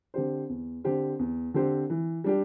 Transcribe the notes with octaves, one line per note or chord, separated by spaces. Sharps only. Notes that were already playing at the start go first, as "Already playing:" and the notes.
D3 C4 G4 C5
E2
D3 C4 G4 C5
E2
D3 C4 G4 C5
E3
G3 D4 G4